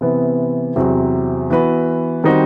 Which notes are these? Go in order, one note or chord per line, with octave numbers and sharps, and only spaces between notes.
C3 E3 B3
E2 C3 F#3 C4 F#4
E3 B3 F#4 B4
D#3 G3 C4 D#4 F#4